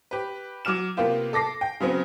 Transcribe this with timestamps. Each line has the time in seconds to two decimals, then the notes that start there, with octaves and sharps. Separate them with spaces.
0.11 G4 B4
0.65 F#3 D6 F6 E7
0.97 C3 A#3 B3 F4 G4
1.33 A4 D6 A#6 C7
1.61 G5
1.80 C#3 F#3 B3 C4